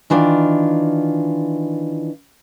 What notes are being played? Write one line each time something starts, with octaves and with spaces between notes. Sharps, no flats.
D#3 E3 D4 F4